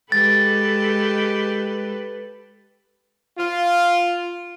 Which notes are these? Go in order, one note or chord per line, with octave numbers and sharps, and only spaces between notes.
G#3 G4 A4 B4 A6
F4